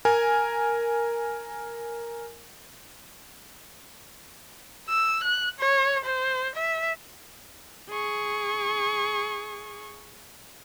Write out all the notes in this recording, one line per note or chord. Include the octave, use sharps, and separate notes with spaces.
A#4 G#5
E6
F#6
C#5
C5
E5
G#4 C#6